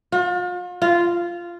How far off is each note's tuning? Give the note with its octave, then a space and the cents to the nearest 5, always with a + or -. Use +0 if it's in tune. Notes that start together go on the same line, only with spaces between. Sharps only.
F4 +40
F4 -10